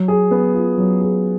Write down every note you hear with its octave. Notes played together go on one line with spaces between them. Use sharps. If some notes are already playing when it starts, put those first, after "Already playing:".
Already playing: F#3
G#4
B3
F4
F#3
G#4